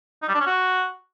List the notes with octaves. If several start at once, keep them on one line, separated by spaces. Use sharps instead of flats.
D#4
G3
D4
C#4
F#4